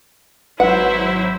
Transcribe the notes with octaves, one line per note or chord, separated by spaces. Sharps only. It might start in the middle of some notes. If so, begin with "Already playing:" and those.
G#1 F#3 E4 B4 C5 F#5